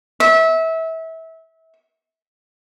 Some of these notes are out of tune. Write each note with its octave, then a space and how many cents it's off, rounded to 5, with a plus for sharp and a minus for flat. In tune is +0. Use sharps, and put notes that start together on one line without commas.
E5 -25